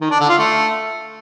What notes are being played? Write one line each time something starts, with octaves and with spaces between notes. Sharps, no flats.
D#3
D4
D3
F4
A3